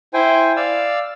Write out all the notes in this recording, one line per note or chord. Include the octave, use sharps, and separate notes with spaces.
E4 C5 G5 G#5
D5 F5 E6